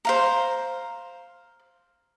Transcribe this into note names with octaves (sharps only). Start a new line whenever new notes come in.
C5 F5 A#5